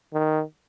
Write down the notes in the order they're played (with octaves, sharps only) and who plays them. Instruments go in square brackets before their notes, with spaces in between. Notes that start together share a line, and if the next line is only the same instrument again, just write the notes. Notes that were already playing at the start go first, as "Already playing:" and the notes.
[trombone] D#3